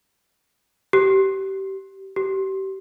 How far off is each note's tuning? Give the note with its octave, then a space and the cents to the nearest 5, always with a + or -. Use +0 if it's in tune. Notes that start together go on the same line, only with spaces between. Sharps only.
G4 -25
G4 -30